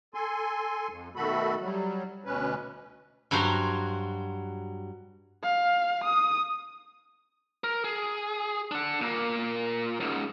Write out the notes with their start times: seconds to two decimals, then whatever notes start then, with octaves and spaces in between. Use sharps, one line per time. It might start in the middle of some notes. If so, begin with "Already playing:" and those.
0.14 A4 G#5 C6
0.89 F2
1.16 B2 D#3 A3 F#4 A4 B5
1.61 F#3 G3
2.25 D2 B2 C#4 B4
3.31 G2 F#3 F#4 C5 A#5 C6
5.43 F5
6.04 D#6
7.64 A#4
7.84 G#4
8.71 D4 F#5
9.01 A#2 A#3
10.00 C#2 G#2